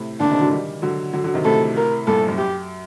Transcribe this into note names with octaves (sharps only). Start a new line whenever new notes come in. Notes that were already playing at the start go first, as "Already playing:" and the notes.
Already playing: A2 C3
A#2 D3 D4
C3 D#3
D3 F#3
D#3 G3
D3 F#3
D3 F#3
D3 F#3
C3 D#3
A2 C3 A4
A#4
G2 A#2 A4
F#2
G4